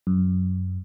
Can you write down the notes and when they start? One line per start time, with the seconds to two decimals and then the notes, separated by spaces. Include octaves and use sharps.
0.07 F#2